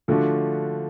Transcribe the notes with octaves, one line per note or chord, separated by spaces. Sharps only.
D3 F3 A3 D4 F#4